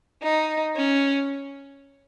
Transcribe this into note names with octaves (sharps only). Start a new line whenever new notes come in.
D#4
C#4